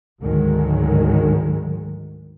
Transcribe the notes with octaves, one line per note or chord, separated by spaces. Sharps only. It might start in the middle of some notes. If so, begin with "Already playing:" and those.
D2 G#2 D#3 F#3 G#3